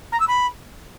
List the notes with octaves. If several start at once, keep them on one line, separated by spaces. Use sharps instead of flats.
A#5
E6
B5